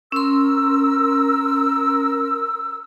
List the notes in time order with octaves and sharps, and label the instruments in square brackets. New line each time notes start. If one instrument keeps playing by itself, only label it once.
[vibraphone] C#4 C6 [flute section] A#4 E6